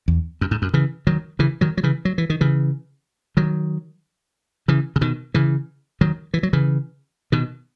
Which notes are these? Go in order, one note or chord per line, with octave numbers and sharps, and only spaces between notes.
E2
F#2
G#2
F#2
C#3 E3
D#3 F#3
C#3 E3
D#3 F#3
F#3
C#3 E3
F#3
E3
D#3
C#3 E3
D#3 F#3
C#3 E3
C#3
B2 D#3
C#3 E3
D#3 F#3
E3
F#3
C#3 E3
B2 D#3